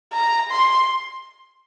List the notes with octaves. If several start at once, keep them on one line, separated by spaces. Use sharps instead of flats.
A#5
C6